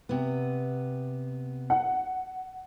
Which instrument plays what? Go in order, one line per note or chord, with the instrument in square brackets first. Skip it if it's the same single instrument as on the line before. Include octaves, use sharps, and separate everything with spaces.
[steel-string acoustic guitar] C3 B3
[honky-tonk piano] F#5